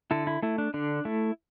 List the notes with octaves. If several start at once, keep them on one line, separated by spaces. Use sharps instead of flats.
D3 E4 A4
E4
A3 E4
D4
D3 D4
A3 E4